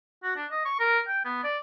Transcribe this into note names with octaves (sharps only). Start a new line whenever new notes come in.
F#4
D4
D#5
C#6
A#4
G5
B3
D5